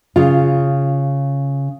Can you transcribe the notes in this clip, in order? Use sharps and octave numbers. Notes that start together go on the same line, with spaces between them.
C#3 F4